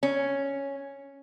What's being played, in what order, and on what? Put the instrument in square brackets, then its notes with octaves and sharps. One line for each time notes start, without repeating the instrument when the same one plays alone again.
[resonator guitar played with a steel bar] C#4